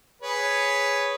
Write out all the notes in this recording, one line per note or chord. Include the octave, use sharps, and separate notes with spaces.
G#4 B4 C#5